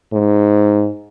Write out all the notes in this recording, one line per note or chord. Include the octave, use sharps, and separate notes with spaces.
G#2